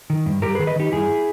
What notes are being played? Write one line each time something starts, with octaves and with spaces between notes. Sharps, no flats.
D#3
G2
G2 G4 A#4
G#4 B4
D#3
B4 D#5
D#3 D#4 G4
G2 E4 G#4